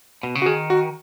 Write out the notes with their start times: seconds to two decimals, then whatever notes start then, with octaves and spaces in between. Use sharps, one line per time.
0.23 B2
0.35 C#3
0.42 F#4
0.46 D#3 G#4
0.70 F#4